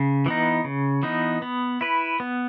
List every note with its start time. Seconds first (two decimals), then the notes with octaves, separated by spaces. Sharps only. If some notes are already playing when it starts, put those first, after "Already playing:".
Already playing: C#3
0.26 E3 B3 D#4
0.64 C#3
1.03 E3 B3 D#4
1.42 B3
1.81 E4 B4
2.20 B3